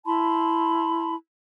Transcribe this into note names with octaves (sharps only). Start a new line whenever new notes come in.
E4 A5 B5 C6